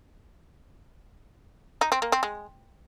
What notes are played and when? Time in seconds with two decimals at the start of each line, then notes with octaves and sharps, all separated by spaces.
1.81 D#4
1.92 C4
2.02 A#3
2.12 C4
2.23 G#3